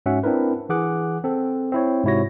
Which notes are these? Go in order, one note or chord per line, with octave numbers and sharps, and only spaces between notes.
G#2 C#4 F#4 E5 F#5
C4 D4 E4 A#4 B4
E3 G#4 F#5 D6 F#6
C4 A4
C4 E4 C#5
G#2 C3 E4 F#4 C#5 A#6